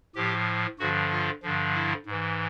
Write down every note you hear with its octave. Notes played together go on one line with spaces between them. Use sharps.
A2 F3 G4
G2 D3 F3 F#4
F4
G2 D3 F3
E4
G#2
E3